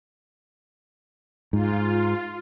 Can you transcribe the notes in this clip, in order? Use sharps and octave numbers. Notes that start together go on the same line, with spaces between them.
G#2 F4